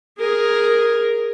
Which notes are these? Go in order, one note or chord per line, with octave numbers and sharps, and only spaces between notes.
G#4 A#4